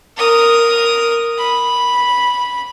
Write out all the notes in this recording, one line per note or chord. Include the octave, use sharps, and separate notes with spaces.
A#4 D#6
B5